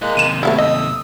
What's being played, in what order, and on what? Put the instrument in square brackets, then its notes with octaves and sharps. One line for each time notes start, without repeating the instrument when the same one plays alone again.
[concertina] G#3 A#3 F#6 [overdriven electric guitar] E4 D#5
[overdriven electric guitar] D#2 C3 [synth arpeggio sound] D#7 E7
[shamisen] A3 B3 E4 [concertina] F5
[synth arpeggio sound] D#5 [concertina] D#6 E6